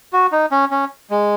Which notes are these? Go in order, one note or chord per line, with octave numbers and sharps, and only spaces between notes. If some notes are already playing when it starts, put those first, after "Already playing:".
F#4
D#4
C#4
C#4
G#3